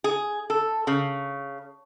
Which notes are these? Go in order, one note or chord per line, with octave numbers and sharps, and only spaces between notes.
G#4
A4
C#3